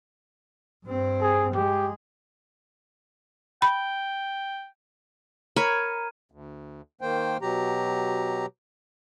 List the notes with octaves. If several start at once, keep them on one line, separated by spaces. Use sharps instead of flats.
G2 C4
G#4
G#3 G4
G5 B5
A#4 C#5 A#5 B5 F6 D#7
D2
D#3 A#3 C5 G5
B2 F#3 G4 A#5